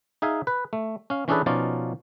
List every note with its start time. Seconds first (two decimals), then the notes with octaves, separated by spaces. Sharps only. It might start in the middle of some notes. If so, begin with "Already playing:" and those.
0.22 D#4 G#4 E5 F5 G#5
0.47 B4
0.73 A3
1.10 C#4 F5
1.28 E3 C#4 D4 G#4 A4 B4
1.46 B2 F3 C#4 D#4 F4 D5